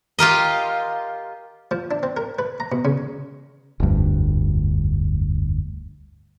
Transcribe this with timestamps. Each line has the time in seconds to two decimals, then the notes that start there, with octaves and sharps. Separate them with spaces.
0.19 F4 G4 A#4 D#5
1.71 F3
1.91 D4
2.03 C4
2.17 A#4
2.39 B4
2.60 A#5
2.72 B2
2.85 C#3
3.80 F1 D2 G2